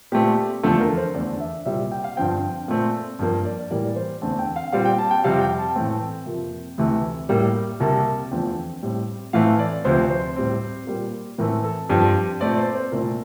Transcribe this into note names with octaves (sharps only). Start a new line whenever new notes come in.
A#2 A3 C4 G4
E2 D3 F3 A3 A4
A#4
C5
E2 D3 A3 D5
E5
C2 A#2 G3 C4 E5
G5
F5
G2 D3 F3 C4 G5
A#2 A3 C4
G2 F3 A#3
D5
A2 E3 G3 A#3 D5
C5
E2 D3 A3 C4 A5
G5
F5
A#2 G3 C4 F5
G5
A5
G5
F2 C3 G3 C4 F5
G5
A5
A2 E3 A3 C4 G5
F2 C3 F3 A#3
D2 C3 E3 A3
A2 G3 A#3
C2 C3 G3 A#3 A5
E2 D3 F3 A3 C4 G5
A2 G3 C4
A2 E3 A3 C4 F5
D5
D2 C3 F3 C4 C5
C5
A2 G3 C4
A#2 G3 A#3
A2 E3 A3 C4 A#4
A4
G2 F3 C4 G4
A#2 A3 C4 D5
C5
C5
C2 A#2 A3 C4 A#4